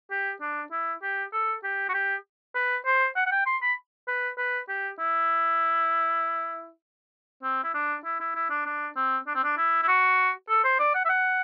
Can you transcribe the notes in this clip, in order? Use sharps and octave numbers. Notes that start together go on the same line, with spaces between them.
G4
D4
E4
G4
A4
G4
F#4
G4
B4
C5
F#5
F#5
G5
C6
B5
B4
B4
G4
E4
C4
E4
D4
E4
E4
E4
D4
D4
C4
D4
C4
D4
E4
E4
F#4
A4
C5
D5
F#5
E5
F#5